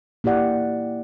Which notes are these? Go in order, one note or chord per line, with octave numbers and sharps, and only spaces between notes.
A#3 E4 G4 D5 F#5